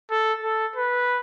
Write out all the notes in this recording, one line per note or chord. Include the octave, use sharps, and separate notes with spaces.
A4
A4
B4